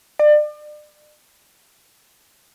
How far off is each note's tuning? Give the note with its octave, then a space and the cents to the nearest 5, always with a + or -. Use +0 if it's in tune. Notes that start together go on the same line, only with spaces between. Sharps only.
D5 +35